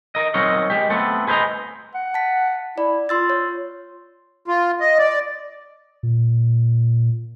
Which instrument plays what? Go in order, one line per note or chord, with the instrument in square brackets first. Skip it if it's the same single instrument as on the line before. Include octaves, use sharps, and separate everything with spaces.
[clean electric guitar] A#4 D#5
F#3 C4 D#4 A#4 C#5 D#5
G#3 G4
A3 B3 C4 A4
G#4 B4 C5 D#5 A#5
[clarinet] F#5
[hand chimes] A5 B6
[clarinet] E4 [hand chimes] D5
[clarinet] F4 [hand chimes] C6 E6 A6
[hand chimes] C#5
[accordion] F4
D#5
D5
[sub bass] A#2